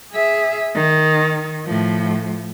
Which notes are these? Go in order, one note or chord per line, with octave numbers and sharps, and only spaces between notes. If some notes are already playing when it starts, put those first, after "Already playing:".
G#4 E5
D#3
A2 F3